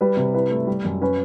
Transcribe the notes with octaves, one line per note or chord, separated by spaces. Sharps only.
G3 B4
C3
E4 B4
A3
G3
F#2
C#4 B4